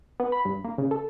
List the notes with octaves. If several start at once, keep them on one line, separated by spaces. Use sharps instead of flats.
B3
B5
G2
A#3
C#3
A4